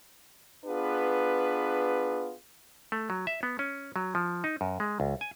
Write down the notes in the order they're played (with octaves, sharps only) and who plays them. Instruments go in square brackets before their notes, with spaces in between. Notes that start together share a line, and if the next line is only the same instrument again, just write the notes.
[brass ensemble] B3 D4 F4 G#4 B4
[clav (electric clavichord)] A3
F#3
E5
B3
C#4
F#3
F3
D#4
F#2
G#3
C#2
G#5